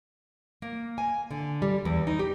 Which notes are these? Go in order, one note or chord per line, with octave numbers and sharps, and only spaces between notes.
A#3
G#5
D3
G3
E2
D#4
G4